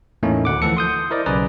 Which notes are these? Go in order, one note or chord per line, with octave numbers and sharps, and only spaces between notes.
E2 A2 A3 A#3 C#4 D#4
D2 F#5 D6
E3 F3 A4 C#7
C6 D#6 G6
E4 A#4 C5 D5 D#5
B1 C#3 G#4 B4 D5 A#5